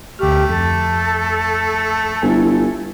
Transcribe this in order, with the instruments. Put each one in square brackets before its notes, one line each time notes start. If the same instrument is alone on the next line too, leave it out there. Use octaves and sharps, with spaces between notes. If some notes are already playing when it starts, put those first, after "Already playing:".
[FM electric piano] D2 F6 [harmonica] A3 [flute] G4
[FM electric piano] F2 [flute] A4
[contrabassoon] G1 [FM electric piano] E4 G#5